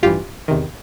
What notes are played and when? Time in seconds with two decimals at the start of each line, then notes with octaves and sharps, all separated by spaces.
0.03 A1 G2 E3 F4 G4
0.48 E2 C3 D#3